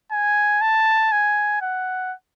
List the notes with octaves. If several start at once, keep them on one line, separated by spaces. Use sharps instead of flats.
G#5
A5
G#5
F#5